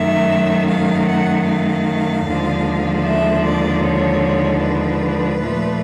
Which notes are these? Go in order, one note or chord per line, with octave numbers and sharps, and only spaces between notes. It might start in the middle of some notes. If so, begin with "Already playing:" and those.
Already playing: F#2 D#3 F#3 A3 E5
F5
F#5
F5
D#2 D3 F3 G#3
E5
D5
C#5
B4
A#2 F3 A3